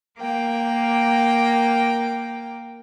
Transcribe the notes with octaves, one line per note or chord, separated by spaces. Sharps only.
A#3 A#4 G5 D6